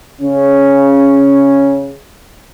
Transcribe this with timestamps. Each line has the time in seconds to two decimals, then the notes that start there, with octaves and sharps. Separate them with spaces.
0.21 C#3 C#4